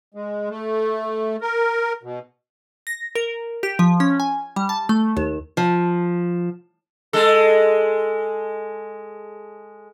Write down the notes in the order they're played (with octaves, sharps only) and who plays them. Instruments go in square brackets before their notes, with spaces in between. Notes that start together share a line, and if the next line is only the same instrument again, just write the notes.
[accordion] G#3
A3
A#4
B2
[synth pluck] A#6
A#4
G4
F3
C#4
G#5
G3
A5
A3
D#2
[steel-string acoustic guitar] F3
[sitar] G#3 A4